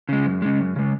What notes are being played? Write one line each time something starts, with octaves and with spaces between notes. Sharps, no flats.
C#3 G#3
F#2
C#3 G#3
F#2
C#3 G#3